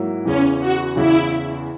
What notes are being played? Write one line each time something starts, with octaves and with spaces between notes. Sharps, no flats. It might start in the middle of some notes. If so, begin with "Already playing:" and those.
Already playing: G#2 F#3 A#3 E4
E2 C#3 E3 C#4
F#4
E2 C#3 E3 E4